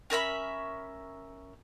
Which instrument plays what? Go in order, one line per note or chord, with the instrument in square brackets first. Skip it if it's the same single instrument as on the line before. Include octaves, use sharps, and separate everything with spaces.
[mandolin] C#4 A#4 E5 B5